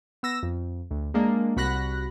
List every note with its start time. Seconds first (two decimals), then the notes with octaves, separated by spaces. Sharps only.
0.23 B3 E6 A#6
0.43 F2
0.91 D2
1.14 G#3 A#3 D4
1.57 C2 F#4 B5 F#6 A#6